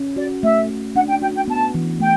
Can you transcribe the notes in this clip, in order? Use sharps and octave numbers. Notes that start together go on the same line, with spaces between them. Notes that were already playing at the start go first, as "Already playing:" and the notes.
Already playing: C#4
F#4 D5
A3 E5
A3
D4 F#5
G5
F#4 G5
G5
B3 A5
E3
A3 G5